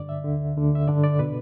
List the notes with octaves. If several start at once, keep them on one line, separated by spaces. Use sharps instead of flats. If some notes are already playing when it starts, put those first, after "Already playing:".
Already playing: G2 D3 D5
E5
D2 D3
D2 D3
E5
G2 D3 D5
D5
B2 B4